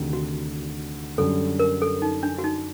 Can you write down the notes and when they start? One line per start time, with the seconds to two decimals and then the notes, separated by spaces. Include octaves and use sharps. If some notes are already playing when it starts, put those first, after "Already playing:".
Already playing: D2 C3 D#3
0.13 F#4
1.18 F#2 D3 G3 A4
1.59 A#4
1.82 A4
2.02 D#4
2.23 D4
2.38 F#4
2.44 D#4